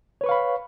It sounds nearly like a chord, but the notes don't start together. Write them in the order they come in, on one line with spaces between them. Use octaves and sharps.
C#5 B4 C#6 F5 B5